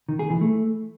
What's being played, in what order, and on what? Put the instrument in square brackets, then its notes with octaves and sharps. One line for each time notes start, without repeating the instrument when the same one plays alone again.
[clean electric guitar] D#3
G#4
E3
A3